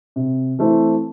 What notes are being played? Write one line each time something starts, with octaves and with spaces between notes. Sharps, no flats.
C3
E3 A3 C4 E4